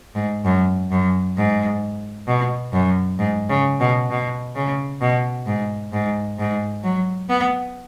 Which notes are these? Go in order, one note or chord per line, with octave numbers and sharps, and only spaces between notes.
G#2
F#2
F#2
G#2
B2
F#2
G#2
C#3
B2
B2
C#3
B2
G#2
G#2
G#2
F#3
B3